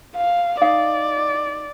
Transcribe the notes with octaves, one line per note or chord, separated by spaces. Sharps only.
F5
D#4 D5 F5